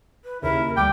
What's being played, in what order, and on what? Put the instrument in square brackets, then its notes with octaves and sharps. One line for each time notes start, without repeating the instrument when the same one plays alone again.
[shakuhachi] B4
[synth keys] D#2 C#3 [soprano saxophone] E4 [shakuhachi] A#4
[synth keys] D2 G3 [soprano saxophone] G5 [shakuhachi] D6